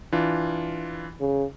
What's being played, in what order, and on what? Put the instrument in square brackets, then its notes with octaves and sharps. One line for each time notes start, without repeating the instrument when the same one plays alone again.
[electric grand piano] E3 D4 F4
[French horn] C#3